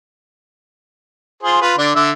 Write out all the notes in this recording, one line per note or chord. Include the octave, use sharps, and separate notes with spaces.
F4 G#4 C5
F4 B4
D3 D4
D3 E5